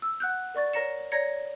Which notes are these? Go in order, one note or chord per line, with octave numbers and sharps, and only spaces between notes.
E6
F#5 F#6 G6
A#4 D5 C#6 A6
A#4 C#5 A#5 A#6 C#7 E7
C#5 D5 A#5 G#6 A#6 C#7